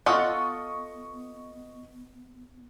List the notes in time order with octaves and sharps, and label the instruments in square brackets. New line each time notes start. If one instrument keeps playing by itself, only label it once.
[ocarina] B3 [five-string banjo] F4 A4 F#5 [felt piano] D#5 C#6 D#6